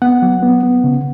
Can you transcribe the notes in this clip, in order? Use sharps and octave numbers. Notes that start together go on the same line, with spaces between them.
B3 F#5
F#3
B3
B3
C#3